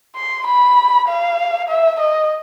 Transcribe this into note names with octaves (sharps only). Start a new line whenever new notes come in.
C6
B5
F5
E5
D#5